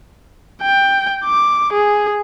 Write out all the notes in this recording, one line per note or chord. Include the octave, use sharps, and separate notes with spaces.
G5
D6
G#4